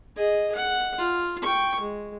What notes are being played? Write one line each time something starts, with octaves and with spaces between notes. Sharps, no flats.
G#4 D#5
F#5
F4
G5 C#6
G#3